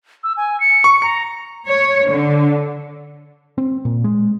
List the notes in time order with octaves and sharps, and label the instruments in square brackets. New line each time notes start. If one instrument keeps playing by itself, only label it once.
[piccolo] E6
G#5
C#7
[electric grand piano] C#6
[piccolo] A#5 [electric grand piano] C#7
[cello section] C#5
D3
[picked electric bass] C4
A#2
G#3